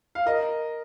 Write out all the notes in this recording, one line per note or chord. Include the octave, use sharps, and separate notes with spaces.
F5
A#4 D#5